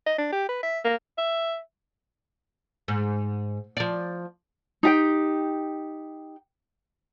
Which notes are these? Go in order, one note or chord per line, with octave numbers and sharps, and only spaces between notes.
D#5
D4
G4
B4
E5
A#3
E5
G#2
F3 D5
D#4 G4 G5